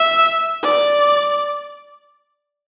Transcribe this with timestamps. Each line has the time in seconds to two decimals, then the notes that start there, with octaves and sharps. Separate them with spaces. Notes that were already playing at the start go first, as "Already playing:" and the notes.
Already playing: E5
0.63 D5